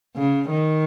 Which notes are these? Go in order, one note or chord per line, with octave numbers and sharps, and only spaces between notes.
C#3
D#3